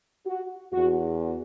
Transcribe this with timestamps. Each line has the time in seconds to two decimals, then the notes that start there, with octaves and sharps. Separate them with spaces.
0.27 F#4
0.72 E2 F#4